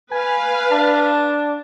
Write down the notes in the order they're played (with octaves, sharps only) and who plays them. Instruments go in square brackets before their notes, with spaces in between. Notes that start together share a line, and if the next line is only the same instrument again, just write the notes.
[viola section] B4 F5 [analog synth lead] G#5
[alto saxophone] D4 [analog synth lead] A5